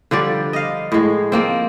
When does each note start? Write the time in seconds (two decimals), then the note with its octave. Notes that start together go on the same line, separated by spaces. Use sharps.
0.11 D3 F3 G3 D5
0.53 D#5 F5
0.92 A2 G#3
1.32 F3 A#3 C4